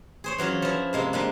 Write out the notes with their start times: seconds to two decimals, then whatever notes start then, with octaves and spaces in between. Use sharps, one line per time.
0.24 G#4 C5 C#5
0.38 E3 F#3 C#4 F4
0.62 F3 E4
0.93 C3 G#3 A#3
1.13 G3 A#3 D4